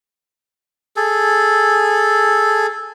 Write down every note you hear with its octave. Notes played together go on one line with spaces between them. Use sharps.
G#4 A4